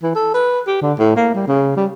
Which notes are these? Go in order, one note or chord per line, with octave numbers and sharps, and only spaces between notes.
E3
A4
B4
G4
D3
A2
A#3
G3
C#3
G3